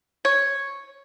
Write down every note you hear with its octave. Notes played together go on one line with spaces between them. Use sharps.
C#5